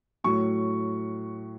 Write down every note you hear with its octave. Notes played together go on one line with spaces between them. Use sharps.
A2 F#3 C#6